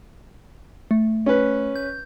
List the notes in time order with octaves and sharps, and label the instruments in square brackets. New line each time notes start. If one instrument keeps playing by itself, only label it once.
[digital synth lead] A3
[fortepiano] C#4 B4
[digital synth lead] G6